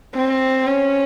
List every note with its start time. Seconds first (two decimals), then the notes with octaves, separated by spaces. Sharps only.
0.15 C4
0.66 C#4